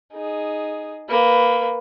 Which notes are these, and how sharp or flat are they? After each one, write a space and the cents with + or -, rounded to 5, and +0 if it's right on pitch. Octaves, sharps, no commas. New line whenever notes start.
D#4 -5 G#4 +5
A#3 +0 B4 +10